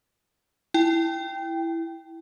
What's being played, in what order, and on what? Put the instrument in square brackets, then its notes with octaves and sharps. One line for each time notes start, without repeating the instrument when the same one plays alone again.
[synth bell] E4 G5